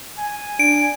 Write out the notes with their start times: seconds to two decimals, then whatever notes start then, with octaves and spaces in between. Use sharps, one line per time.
0.18 G#5
0.60 D4 D7